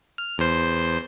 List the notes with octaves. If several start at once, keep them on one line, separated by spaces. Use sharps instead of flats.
F6
E2 C5